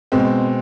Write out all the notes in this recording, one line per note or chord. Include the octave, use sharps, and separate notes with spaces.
B2 G#3 C4